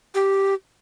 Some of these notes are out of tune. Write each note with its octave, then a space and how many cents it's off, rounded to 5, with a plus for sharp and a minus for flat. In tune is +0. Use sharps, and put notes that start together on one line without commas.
G4 -5